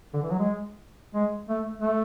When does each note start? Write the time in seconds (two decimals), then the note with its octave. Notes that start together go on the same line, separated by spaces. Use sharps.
0.14 D3
0.22 E3
0.30 F#3
0.39 G#3
1.14 G#3
1.49 A3
1.82 A3